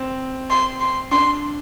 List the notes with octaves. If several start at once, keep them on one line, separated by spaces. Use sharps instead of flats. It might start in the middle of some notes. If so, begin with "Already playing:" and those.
Already playing: C4
C6
C6
D4 C6